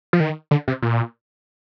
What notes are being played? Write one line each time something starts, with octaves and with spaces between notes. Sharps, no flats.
F3
D#3
D3
C3
A#2